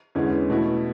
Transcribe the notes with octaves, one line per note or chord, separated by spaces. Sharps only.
E2 D3 G#3 C#4 E4
B2 A3 E4